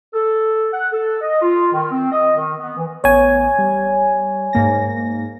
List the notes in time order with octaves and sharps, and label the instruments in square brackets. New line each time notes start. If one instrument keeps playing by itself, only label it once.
[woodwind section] A4
F#5
A4
D#5
F4
D#3
C4
D#5
D#3
B3
E3
[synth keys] A1 B3 [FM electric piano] C#5 G#5
[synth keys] G3
G#2 A#3 A#6